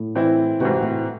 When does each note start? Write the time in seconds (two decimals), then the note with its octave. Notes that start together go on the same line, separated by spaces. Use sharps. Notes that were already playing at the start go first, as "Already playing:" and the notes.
Already playing: A2
0.15 E3 C4 E4
0.60 G#2 C3 E3 C4 F#4
0.83 A2